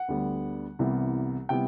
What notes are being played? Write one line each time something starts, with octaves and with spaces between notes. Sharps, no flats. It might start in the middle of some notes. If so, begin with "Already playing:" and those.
Already playing: F#5
D2 D3 G3 B3
C2 C3 E3 G3 B3
C3 E3 G3 B3 G5